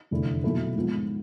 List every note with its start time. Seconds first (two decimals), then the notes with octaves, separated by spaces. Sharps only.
0.11 F1 E2 D3 A3 E4
0.43 B1 B2 B3 E4 A4
0.76 G#2 F3 B3